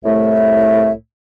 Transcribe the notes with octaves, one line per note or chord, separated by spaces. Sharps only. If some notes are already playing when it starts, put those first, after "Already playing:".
C2 A2 A3 E5